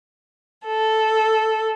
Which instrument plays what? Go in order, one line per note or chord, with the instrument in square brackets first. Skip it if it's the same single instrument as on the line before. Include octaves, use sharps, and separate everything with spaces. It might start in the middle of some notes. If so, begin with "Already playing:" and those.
[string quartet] A4